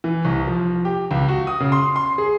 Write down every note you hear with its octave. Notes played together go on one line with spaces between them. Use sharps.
E3
C2
F3
G4
C#2
F#4
D#6
C#3
C6
C6
G#4